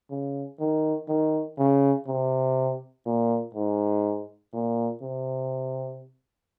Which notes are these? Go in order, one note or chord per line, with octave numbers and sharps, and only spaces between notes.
C#3
D#3
D#3
C#3
C3
A#2
G#2
A#2
C3